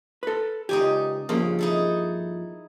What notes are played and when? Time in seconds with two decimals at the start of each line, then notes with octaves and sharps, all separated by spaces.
0.23 A4 B4
0.69 C#2 D#4 G4 D5 G#5
1.29 G2 C#3 F3 A#3
1.59 D#4 E4 A4